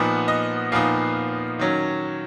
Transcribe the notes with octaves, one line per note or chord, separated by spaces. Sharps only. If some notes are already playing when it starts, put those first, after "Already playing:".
Already playing: A#2 F3 B3 D#4 F#5
D#5
A#2 F3 B3 D#4 F5
D#3 F#3 C#4